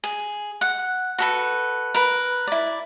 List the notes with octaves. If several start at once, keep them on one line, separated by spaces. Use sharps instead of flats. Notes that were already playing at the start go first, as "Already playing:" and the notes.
G#4
F#5
F#4 A4 B4
A#4 B4
E4 D5